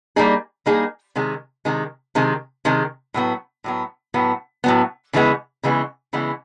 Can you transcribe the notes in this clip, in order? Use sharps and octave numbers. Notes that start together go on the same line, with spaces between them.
G3 A#3 D#4 G#4
G3 A#3 D#4 G#4
C3 D#3 G#3
C3 D#3 G#3
C3 D#3 G#3
C3 D#3 G#3
A2 F#3 B3
A2 F#3 B3
A2 F#3 B3
A2 F#3 B3
C#3 E3 G#3 B3
C#3 E3 G#3 B3
C#3 E3 G#3 B3